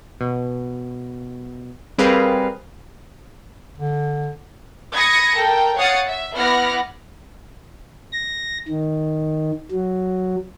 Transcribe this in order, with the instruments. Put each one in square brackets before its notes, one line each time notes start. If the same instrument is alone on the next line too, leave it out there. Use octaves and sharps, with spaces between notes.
[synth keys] B2
G3 C4 G#4 A#4 B4 F5
[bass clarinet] D3
[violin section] B5 D#6 G#6 A#6 C#7
A4 A#4 G5
C#5 F5 F#5 D#6 A6 C#7
E5
B3 E4 F#5 D6 F6 A#6
[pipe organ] A#6
D#3
F#3